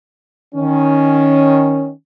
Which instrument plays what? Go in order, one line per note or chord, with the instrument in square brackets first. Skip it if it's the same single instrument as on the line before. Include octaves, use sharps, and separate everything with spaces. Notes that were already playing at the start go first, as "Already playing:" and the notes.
[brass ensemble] D#3 C#4